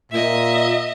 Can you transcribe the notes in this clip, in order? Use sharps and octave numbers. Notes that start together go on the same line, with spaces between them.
A#2 D#5 E5